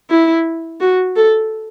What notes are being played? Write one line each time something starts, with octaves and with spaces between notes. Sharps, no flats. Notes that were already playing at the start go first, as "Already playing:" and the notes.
E4
F#4
A4